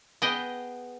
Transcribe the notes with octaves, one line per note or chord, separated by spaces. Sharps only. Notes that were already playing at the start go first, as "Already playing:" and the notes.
B3 G#4 D#5 G5